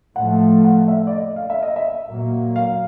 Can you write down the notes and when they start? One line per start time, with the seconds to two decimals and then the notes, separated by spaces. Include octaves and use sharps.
0.16 A2 F3 A3 F#5
0.65 F#5
0.88 E5
1.07 D5
1.13 D#5
1.36 F5
1.50 E5
1.63 D#5
1.76 E5
2.08 A#2 F#3 A#3
2.56 F5